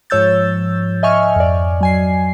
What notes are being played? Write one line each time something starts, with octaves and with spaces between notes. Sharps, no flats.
G#2 F3 C#5 E6 G6 A6
D#5 E5 G#5 C#6 F6
F2 D5
F#3 G#5 C7